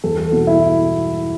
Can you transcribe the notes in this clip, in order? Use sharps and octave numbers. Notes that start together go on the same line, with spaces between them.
E2 A4
A4
B2 F#4
E4